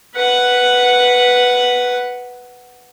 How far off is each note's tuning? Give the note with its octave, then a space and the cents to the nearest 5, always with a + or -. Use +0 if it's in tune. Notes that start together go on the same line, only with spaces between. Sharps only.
B4 +0 F#5 +0